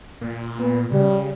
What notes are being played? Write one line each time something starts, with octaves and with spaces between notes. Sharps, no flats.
A#2
B3
C#3 G3